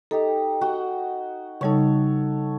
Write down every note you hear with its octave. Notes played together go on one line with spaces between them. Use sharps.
D#4 G4 A4
F#4 F#5 G5
C#3 G3 D#4 A4 C#5